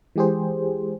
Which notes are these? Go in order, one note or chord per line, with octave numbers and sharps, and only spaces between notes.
E3 G#3 G4 G#4 C5